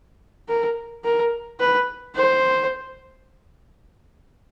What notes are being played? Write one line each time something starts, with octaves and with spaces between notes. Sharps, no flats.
A#4
A#4
B4
C5